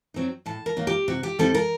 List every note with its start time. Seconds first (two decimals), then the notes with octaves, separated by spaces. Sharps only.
0.14 F#3 C4 D#4
0.46 A2 A5
0.66 A#4
0.77 F#3 A#3 D#4
0.87 G4
1.08 C3 F#4
1.23 G4
1.39 G3 C4 D#4 A4
1.55 A#4